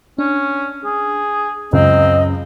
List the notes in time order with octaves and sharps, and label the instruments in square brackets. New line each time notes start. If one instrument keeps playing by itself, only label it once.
[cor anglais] C#4 [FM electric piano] D4
[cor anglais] G#4
[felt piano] C#2 [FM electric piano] F#2 [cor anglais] C4 [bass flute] D#5